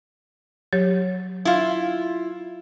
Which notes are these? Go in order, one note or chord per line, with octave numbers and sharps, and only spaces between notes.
F#3 G4 C#5
E4 F4